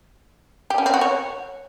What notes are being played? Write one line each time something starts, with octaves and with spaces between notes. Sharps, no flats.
G4
C#4
C4
F#4
C#5